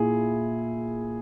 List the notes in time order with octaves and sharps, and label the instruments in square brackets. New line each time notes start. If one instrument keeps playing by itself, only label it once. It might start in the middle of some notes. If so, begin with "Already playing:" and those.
Already playing: [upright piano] A#2 E4 G#4